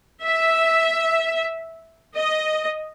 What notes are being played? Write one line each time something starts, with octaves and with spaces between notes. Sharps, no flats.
E5
D#5